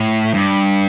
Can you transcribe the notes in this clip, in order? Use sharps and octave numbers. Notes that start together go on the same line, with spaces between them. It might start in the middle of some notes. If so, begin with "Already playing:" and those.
Already playing: A2
G2